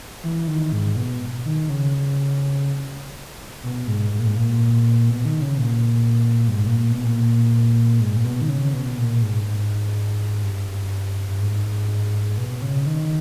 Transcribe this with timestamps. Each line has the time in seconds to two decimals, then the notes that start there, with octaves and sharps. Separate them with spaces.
0.23 E3
0.48 D#3
0.72 G#2
0.96 B2
1.45 D#3
1.69 C#3
3.63 B2
3.87 G#2
4.12 G#2
4.19 A#2
4.26 G#2
4.36 A#2
5.09 B2
5.25 D#3
5.42 C#3
5.58 A#2
6.48 G2
6.55 G#2
6.67 A#2
6.79 A#2
6.91 B2
7.04 A#2
8.00 G#2
8.16 A#2
8.25 B2
8.41 D#3
8.49 C#3
8.63 C#3
8.73 B2
8.98 A#2
9.22 G#2
9.46 G#2
10.43 G2
11.29 G2
11.41 G#2
12.38 B2
12.62 C#3
12.86 D#3